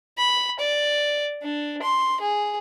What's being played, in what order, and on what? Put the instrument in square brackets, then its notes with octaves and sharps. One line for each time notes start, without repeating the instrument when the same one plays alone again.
[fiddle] B5
D5
D4
C6
G#4